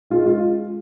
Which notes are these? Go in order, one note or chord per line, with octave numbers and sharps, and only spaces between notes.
G#3 F4
F4